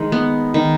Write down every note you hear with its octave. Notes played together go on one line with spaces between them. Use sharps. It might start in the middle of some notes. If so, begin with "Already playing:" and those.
Already playing: D#3 G#3
B3
D#3